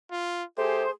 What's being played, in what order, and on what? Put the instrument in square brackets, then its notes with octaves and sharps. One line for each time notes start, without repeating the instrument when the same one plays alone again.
[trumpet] F4
[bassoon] A3 [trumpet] G4 [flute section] G#4 C6 [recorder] C5